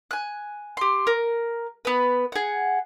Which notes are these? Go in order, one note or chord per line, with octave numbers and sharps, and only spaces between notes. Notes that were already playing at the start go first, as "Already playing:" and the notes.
G#5 F#6
G4 C6
A#4
B3 B4
G#4 F#5